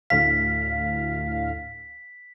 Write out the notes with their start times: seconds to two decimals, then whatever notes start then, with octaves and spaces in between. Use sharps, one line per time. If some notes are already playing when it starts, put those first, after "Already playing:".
0.10 D2 A2 F5 B6